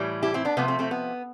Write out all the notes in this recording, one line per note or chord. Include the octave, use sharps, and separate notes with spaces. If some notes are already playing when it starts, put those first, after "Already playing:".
Already playing: A2 E3 G3
E4 G4
C4 E4
B3 D4
C3 F3 A3 B3
A3 C4
A3 C4
B3